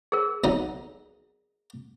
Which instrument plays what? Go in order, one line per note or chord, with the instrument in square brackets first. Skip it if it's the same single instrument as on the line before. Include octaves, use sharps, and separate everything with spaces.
[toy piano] G#4 A#4
[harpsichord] B1 F#3 D#4